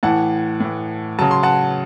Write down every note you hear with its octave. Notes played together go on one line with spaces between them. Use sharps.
A2 E3 F#5 A5
A2 E3
C#3 F#3 A5
C6
F#5 A5